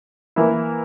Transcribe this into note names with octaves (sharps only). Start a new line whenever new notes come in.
E3 A#3 E4